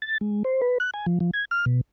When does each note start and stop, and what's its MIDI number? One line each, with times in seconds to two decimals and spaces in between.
0.02 0.18 93
0.21 0.43 56
0.44 0.61 72
0.62 0.78 71
0.80 0.90 90
0.94 1.06 80
1.06 1.19 53
1.20 1.31 53
1.34 1.45 92
1.51 1.65 89
1.66 1.81 47